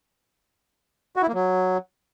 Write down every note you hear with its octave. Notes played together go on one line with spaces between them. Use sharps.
F#4
E4
A#3
F#3